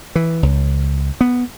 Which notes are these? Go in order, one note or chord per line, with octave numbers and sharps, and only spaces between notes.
E3
C#2
B3